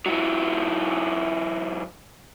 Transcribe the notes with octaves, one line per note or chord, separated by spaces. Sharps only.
E3 F#3